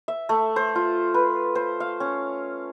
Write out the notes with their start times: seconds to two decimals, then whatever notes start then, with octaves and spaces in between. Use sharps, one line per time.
0.08 E5
0.29 A3
0.56 C5
0.75 F4
1.14 B4
1.55 C5
1.80 F5
2.00 C#4